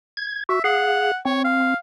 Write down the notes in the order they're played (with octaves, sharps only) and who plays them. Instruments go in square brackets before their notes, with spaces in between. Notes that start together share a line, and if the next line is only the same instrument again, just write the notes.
[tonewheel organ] G#6
[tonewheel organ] F#4 [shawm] E5
[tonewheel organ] G#4 F5 [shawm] F#5
[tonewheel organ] C4 [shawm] C#5
[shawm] F5